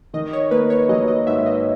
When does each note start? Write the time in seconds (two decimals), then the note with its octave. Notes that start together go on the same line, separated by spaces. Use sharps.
0.14 D#3 D#5
0.33 C#5
0.51 A#3 B4
0.70 C#5
0.89 F#3 D#5
1.08 D#5
1.27 G#2 E5
1.46 D#5